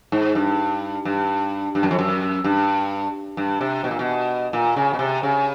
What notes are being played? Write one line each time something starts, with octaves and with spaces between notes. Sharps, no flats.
G#2
G2
G2
G2
F#2
F2
F#2
G2
G2
C3
B2
A#2
B2
A#2
C#3
B2
C3
C#3